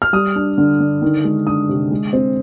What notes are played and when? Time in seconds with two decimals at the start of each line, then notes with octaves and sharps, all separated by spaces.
0.02 F6
0.13 G3 D#6
0.36 D4
0.58 D3
0.80 D3
1.02 D#3
1.25 G#3
1.47 D4 D#6
1.69 C3
1.91 G#3
2.13 C4